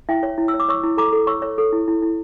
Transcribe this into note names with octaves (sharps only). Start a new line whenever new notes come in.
E4 E5 G5
C#5
E4
E6
C#5
D6
C#5 C#6 E6
E4
A4 A#5 D6
A4
C#5 C#6 E6
C#5
A4
E4
E4
E4